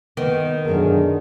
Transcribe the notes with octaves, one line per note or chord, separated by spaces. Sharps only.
D#3 B3
F#2 B2 D3 D4 G#4 A#4